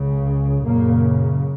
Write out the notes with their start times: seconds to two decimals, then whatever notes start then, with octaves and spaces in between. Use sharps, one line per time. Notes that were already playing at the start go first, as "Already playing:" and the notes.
Already playing: C#2 C#3
0.65 F#2 A#2 C#3 A#3